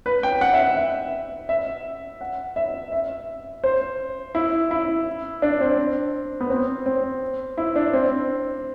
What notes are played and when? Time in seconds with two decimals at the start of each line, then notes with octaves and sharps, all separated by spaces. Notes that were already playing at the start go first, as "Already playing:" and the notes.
0.06 B4
0.23 G5
0.41 F#5
0.53 E5
0.77 E5
1.49 E5
2.21 F#5
2.56 E5
2.92 E5
3.64 C5
4.35 E4
4.71 E4
5.42 D4
5.61 C4
6.41 B3
6.50 C4
6.86 C4
7.58 E4
7.76 D4
7.93 C4